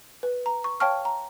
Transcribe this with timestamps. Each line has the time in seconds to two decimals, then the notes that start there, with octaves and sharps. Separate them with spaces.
0.23 B4
0.46 A#5
0.64 C#6
0.80 C#5 F5 G5 A5 C#6 F6
1.05 A#5